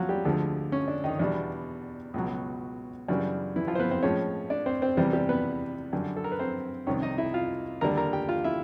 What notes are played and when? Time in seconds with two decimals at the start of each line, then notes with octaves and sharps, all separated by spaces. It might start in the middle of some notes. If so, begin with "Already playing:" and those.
Already playing: D#2 F3 F#3 F4 F#4
0.09 G3 G4
0.25 D2 D3 F3 G#3
0.72 C#4
0.88 D4
1.04 D#3 D#4
1.19 E2 B2 G3 D4
2.14 C#2 B2 F#3
3.08 F#2 C#3 E3 G3 D4
3.56 E3 E4
3.67 F3 F4
3.75 C5
3.80 B3 B4
3.91 C4 C5
4.03 A2 F3 G#3 C#4 C#5
4.50 D4 D5
4.66 C4 C5
4.82 C4 C5
4.97 E2 C3 E3 G3
5.13 G3 G4
5.29 B3 B4
5.93 F#2 D3 G3
6.16 A4
6.24 A#4
6.32 B4
6.39 C4 C5
6.87 C2 C3 D#3 C#4 C#5
7.02 D#4 D#5
7.18 E4 E5
7.34 F4 F5
7.81 D#2 D3 G3 A#4 A#5
7.97 A#4 A#5
8.13 G4 G5
8.29 F4 F5
8.44 E4 E5